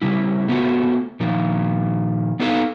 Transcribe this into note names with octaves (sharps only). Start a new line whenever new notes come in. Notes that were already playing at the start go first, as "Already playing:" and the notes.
C#3 G3 E4
A3 B3 C4 F4 F#4
A#2 D#3 F3
B3 D4 D#4 A4 B4 F5